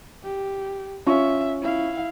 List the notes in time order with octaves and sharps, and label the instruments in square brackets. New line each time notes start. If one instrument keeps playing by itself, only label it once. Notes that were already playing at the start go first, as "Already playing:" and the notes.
[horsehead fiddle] G4
[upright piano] C#4 F4 C#6 [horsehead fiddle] E5
[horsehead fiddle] E4 F5